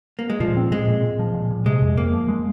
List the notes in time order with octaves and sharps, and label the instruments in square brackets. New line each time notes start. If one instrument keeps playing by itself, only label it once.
[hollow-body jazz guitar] A#3
G#3
[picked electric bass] A#2 [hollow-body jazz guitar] F3
[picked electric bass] C4
[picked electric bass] A#2 [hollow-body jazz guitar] G#3
[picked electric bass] A#2
A#2
F3
A#2
A#2
[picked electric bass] C3 [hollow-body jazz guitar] G#3
[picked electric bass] F2
[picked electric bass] F2 [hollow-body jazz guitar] A#3
[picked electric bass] F3
G#3